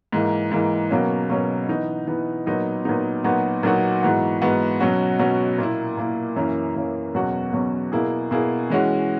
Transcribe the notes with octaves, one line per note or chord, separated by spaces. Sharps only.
G#2 E3 A#3
G#2 E3 A#3
B2 F#3 A#3 C#4
B2 F#3 A#3 C#4
E3 B3 D#4
E3 B3 D#4
A#2 F#3 B3 D#4
A#2 F#3 B3 D#4
A#2 F#3 B3 D#4 F#4
A#2 F#3 B3 D#4 F#4
G#2 E3 B3 F#4
G#2 E3 B3 F#4
B2 F#3 C#4 F#4
B2 F#3 C#4 F#4
A#2 A#3 E4
A#2 A#3 E4
F#2 E3 A#3 C#4
F#2 E3 A#3 C#4
E2 B2 F#3 C#4 F#4
E2 B2 F#3 C#4 F#4
B2 A#3 E4 G#4
B2 A#3 E4 G#4
E3 G#3 C#4 F#4